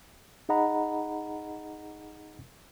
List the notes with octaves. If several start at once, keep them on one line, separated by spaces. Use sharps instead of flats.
D#4 G#4 D#5 F#5 A#5 B5